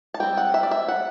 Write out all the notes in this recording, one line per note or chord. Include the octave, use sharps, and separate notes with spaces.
A5
G3 C4 G5
F#5
E5
D5
E5
F#5